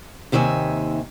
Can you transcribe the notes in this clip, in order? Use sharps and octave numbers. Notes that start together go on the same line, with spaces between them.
D#2 C3 D#3 E5 G#5